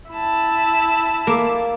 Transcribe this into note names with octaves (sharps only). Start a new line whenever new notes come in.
E4 A5
A#3